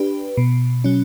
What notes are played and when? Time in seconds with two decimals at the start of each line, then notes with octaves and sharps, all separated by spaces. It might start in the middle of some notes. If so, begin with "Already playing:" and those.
Already playing: D4 G4 B4
0.37 B2
0.84 F#3 C#4